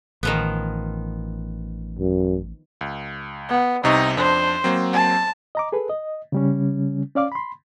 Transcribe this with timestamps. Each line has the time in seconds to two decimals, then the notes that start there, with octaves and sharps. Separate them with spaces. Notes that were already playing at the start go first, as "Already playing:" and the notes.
0.23 A1 D#3 F3 B3
1.99 F#2
2.81 C#2
3.49 B3
3.84 C2 C3 D#4 C#6
4.17 F2 D4 C5
4.64 F#3 A#3 C4
4.93 A5
5.55 D#5 A#5 D6
5.72 G#4 A4 B4
5.90 D#5
6.32 C#3 G3 C#4
7.15 C#4 D5 F5 D6
7.32 B5 C6